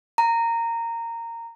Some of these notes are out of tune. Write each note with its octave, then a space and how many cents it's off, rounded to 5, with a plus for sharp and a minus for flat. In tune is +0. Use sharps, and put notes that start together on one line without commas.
A#5 -15